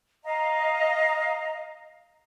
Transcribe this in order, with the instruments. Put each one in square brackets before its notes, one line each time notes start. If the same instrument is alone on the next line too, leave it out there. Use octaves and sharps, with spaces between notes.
[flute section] D#5 F5 A#5